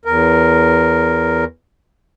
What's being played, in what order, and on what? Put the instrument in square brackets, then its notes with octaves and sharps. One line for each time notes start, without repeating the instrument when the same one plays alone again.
[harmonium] E2 A#4